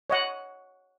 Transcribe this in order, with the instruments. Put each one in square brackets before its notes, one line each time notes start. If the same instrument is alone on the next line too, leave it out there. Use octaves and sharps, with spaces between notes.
[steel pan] C#5 D#5 F#5